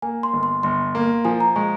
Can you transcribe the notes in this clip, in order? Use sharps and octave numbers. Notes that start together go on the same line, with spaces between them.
A#3 G#5
C6
G1
C6
G1 C6
A#3
F3 G#5
A#5
G#3 C#6